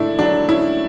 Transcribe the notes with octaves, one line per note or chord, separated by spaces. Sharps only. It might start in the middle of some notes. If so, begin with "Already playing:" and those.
Already playing: A2 A3 D4 E4
F#3 D4
C#4 E4